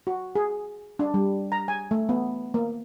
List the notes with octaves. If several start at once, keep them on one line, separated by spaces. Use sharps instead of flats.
F#4
G#4
D4
G3
A#5
G#5
A3
B3
A#3